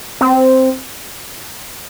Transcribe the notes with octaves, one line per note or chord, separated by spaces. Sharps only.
C4